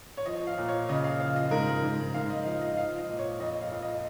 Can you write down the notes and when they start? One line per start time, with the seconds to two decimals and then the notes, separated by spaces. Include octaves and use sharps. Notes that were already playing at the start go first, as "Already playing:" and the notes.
0.17 C#5
0.26 F3 D#5
0.47 F5
0.57 A#2
0.68 C#5
0.89 C#3 D#5
1.04 F5
1.20 F3 F5
1.36 D#5
1.51 G#2 A#4
1.83 G#2
2.14 G#2 F5
2.30 D#5
2.46 F3 F5
2.61 D#5
2.77 F3 F5
2.98 D#5
3.09 A#2
3.19 C#5
3.40 F2 D#5
3.61 F5
3.72 F2
3.82 D#5